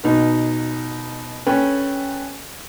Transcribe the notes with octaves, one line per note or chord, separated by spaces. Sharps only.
B2 D#4
C#4 A4 B4 G5 G#5